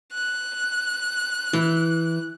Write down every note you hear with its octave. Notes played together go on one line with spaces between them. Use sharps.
F#6
E3